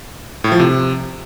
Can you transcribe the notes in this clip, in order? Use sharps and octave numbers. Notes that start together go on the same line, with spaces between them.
A2
F3
C3